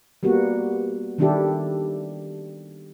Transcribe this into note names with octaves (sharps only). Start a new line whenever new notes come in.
G3 A#3 B3 F#4
D#3 G3 D4 E4 G4 A4